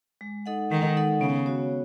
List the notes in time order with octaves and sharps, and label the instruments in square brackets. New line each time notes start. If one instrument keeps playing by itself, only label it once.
[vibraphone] G#3
D#4 A4 D#5 F#5
[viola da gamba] D#3 [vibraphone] G#3
[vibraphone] D#4 A4 D#5 F#5
[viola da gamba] C#3 [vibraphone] B3
[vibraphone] F#4 C#5